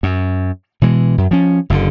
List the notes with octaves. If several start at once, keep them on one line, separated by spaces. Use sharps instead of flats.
F#2
B2 E3 G#3
F#2
F3 C#4
F#1 F#2 A#2 D3